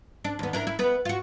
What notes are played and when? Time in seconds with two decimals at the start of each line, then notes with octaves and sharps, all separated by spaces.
0.24 D4
0.39 D#2 B3
0.53 D4 E4 A#4
0.67 E4
0.79 B3 B4
1.05 F4 F#4